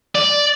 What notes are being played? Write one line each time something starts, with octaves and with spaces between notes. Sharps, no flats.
D5